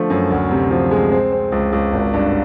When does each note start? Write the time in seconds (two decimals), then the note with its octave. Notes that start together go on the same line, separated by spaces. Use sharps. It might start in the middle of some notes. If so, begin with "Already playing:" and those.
Already playing: D3 F3 A3
0.10 F#2
0.30 D2
0.51 C3
0.71 F3
0.91 G#3
1.12 C4
1.32 C4
1.52 C#2
1.72 C#2
1.93 G#1
2.13 G2